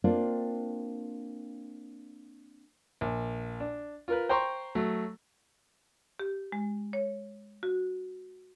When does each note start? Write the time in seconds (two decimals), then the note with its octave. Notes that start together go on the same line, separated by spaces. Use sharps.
0.04 A#3 C4 D4 F4
3.01 A#1
3.60 D4
4.08 F4 A#4 B4
4.29 C5 G5 A#5 C6 C#6
4.75 F#3 A3
6.20 G4
6.52 G#3
6.93 C#5
7.63 F#4